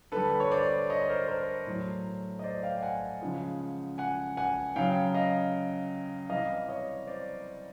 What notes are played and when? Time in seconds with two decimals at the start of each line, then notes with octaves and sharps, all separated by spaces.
0.12 D3 G3 A4 B4
0.40 C#5
0.51 C5 D5
0.90 C#5 D#5
1.09 A#4 C5
1.28 A#4 C5
1.67 A2 F#3
2.39 D#5
2.43 C5 D5
2.63 F5 G5
2.82 F#5 G#5
3.21 C#3 F3 G#3
3.98 F#5 G#5
4.37 F#5 G#5
4.76 C#3 F#3 F5 G5
5.14 D#5 F5
6.30 C3 E3 G3 D#5 F5
6.68 C#5 D#5
7.07 C5 D5